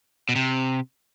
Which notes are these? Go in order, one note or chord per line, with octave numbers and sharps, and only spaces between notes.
B2
C3